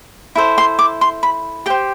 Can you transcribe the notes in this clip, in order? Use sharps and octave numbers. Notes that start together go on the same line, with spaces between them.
E4 A4 C5
C6
D6
C6
B5
G4 C5 G5